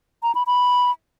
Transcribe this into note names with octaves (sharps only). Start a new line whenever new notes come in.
A#5
B5
B5